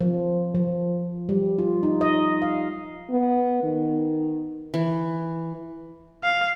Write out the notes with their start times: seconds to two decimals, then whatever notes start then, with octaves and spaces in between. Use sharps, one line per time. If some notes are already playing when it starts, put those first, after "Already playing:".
0.01 F3
0.55 F3
1.29 G3
1.58 F4
1.83 D#4
2.01 D#5
2.42 F5
3.10 B3
3.63 D#3
4.74 E3
6.24 F5